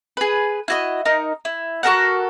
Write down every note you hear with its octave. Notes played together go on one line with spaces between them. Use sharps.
G#4 B4
E4 F#4 D#5
D#4 A#4
E4
F#4 A4 A#4 F#5